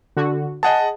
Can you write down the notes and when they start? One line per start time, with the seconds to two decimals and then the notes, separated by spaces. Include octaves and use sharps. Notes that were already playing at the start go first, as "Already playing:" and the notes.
0.16 D3 F#4
0.63 G#4 D#5 F#5 A5